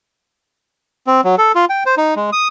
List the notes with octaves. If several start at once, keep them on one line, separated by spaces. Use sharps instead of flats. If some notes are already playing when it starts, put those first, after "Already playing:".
C4
F#3
A4
F4
G5
C5
D#4
G#3
D#6